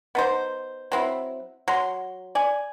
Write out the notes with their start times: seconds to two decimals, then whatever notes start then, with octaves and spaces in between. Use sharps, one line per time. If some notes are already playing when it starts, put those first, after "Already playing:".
0.15 B3 D#4 C5
0.92 F#3 C4 E4
1.68 F#3 C6
2.35 D5 G#5